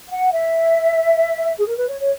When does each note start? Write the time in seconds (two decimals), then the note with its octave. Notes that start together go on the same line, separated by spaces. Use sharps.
0.09 F#5
0.32 E5
1.59 G#4
1.66 A#4
1.77 B4
1.88 C#5
2.00 C#5